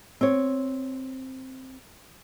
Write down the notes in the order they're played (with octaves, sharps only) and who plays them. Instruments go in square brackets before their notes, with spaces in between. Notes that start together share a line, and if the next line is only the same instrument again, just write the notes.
[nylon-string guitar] C4 C#5